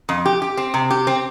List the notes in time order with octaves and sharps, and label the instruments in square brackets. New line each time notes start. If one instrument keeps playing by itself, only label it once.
[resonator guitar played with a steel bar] F2
G4
G4
C4
C3
G4
C4